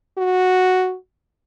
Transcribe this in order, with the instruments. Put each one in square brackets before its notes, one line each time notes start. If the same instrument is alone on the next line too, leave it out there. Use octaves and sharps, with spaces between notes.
[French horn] F#4